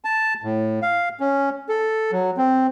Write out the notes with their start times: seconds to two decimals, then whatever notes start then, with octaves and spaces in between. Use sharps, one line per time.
0.05 A5
0.43 A2
0.82 F5
1.20 C#4
1.69 A4
2.12 F#3
2.37 C4